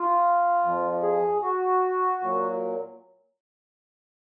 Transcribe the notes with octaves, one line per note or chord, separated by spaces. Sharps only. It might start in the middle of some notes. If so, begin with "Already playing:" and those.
Already playing: F4
F2 F3
G#4
F#4
A#2 F#3